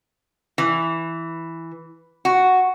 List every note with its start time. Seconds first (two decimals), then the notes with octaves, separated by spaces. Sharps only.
0.58 E3
2.25 F#4